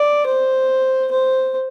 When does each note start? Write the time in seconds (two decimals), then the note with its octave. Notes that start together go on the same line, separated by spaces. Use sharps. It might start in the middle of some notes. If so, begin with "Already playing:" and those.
Already playing: D5
0.26 C5
1.11 C5